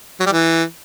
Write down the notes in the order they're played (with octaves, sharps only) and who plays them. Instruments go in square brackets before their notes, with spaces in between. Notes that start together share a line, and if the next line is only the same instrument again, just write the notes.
[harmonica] F#3
G3
E3